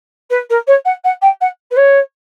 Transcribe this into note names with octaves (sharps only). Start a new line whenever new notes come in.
B4
A#4
C#5
F#5
F#5
G5
F#5
B4
C#5